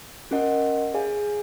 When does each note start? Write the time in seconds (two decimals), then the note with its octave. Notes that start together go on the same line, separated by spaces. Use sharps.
0.31 C#4 F#4 A#4 D#5 F#5
0.94 G#4 C#5 F5 G#5